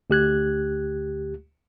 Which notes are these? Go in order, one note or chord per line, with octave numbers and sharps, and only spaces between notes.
D2 G4 F#6 G#6